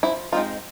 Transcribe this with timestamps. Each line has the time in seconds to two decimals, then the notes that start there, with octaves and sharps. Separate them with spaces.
0.03 F3 E4
0.32 G#3 C4 D#4 F4